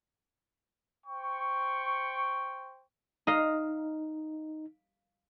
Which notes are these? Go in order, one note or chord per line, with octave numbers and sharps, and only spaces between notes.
C5 G5 C#6
D#4 D#5 F5 A#5